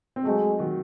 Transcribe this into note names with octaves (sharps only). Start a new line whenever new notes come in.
C4
F#3 G#3 A3
D#3 F#3